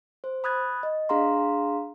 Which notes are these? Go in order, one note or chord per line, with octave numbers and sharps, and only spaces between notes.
C5
B5 D#6 F#6 G#6 A6
D#5
D4 G#4 F5 A#5 C6